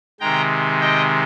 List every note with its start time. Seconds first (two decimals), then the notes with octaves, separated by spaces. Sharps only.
0.20 C3 D#3 G#3 G5 A#5
0.81 D#5 G5